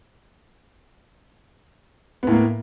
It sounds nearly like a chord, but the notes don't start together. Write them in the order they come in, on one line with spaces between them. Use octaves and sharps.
B3 A2 A#3